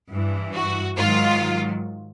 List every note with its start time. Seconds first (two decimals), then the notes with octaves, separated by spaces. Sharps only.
0.10 G2 E3
0.54 F#4
0.98 G#2 D#3 F#3 F4